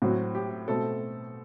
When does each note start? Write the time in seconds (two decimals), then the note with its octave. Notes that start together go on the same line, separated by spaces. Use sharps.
0.02 A2 F#3 C4 F#4
0.35 G4
0.68 B2 A3 C4 A4